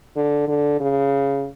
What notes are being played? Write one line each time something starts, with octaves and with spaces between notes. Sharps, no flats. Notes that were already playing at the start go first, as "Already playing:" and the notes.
D3
D3
C#3